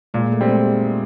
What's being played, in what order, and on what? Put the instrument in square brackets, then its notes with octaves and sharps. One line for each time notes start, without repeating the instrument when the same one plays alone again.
[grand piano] A#2 [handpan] G#3
[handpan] A3
[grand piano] G3 C4
[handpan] G#3